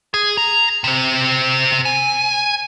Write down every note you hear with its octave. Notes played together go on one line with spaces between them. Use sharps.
G#4
A#5
C3 C4
G#5